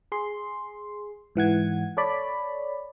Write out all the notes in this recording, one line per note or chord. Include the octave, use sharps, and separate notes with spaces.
G#4 C6
G#2 E3 F#5 G#6
A4 C#5 D5 B5